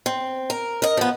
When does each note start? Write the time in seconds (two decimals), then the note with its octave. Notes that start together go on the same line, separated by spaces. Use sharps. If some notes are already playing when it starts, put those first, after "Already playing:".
0.06 C4
0.50 A#4
0.82 A#4 D#5
0.97 F3 B3